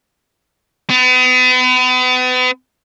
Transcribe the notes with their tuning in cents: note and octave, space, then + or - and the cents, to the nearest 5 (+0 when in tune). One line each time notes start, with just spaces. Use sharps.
B3 +40